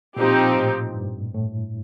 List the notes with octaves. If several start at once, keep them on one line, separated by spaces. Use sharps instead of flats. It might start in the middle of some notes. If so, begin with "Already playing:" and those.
A#2 F3 C4 D#4 G4
A2
G2
A2